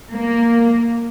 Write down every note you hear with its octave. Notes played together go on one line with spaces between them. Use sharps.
A#3